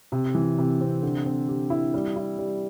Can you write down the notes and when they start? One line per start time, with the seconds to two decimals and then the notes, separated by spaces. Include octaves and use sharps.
0.12 C3
0.35 E3
0.58 C3
0.81 C4
1.02 D3
1.26 C4
1.48 G4
1.70 E4
1.94 G3
2.16 E4
2.39 G3